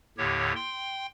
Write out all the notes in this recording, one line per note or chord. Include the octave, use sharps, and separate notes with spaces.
D#2 A2 D3 G4 C#5
G5 C6